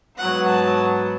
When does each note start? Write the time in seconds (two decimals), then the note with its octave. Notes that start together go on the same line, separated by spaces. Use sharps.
0.17 G#2 F#3 B3 F#5
0.48 A5